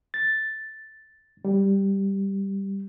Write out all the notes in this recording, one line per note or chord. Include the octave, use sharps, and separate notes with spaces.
A6
G3